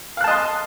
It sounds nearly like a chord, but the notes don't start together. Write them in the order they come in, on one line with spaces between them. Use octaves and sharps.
F5 F#6 A5 D#5 C6